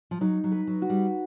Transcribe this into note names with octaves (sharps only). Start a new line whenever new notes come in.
F3
F#3 D#4
F#3
B4
F#3
F#4
G3